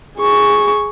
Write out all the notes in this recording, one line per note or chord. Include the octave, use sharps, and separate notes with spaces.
G#4 C#6